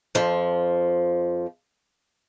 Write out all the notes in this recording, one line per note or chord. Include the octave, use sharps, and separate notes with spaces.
F2 F3